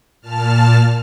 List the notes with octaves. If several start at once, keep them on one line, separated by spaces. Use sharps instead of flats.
A#2 A5 F6